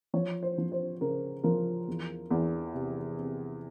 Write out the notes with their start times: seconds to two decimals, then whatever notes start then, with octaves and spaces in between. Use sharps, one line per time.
0.14 F3 C#5
0.43 C5
0.58 F3
0.72 C5
1.01 C#3 A#4
1.44 F3 A#4
1.88 E2
2.30 E2
2.74 C3
3.18 C3